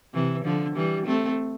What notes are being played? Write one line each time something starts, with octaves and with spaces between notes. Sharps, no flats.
C3 E3
D3 F3
E3 G3
A3 C4